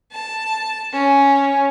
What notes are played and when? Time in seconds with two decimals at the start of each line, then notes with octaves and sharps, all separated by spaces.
0.11 A5
0.93 C#4